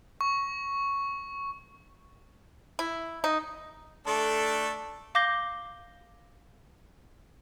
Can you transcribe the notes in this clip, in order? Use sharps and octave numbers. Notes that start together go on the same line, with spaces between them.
C#6
E4
D#4
A3 D4 A4
F5 D6 G6 A#6 G7